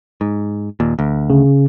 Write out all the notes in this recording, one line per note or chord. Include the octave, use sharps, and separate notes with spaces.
G#2
D#2 A#2
D2
C#3